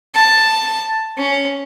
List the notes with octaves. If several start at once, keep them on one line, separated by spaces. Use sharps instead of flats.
A5
C#4